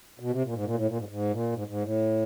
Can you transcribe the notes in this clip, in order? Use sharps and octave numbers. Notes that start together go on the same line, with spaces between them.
B2
C3
A#2
G#2
A#2
A2
A#2
G#2
G#2
A#2
G#2
G#2
A2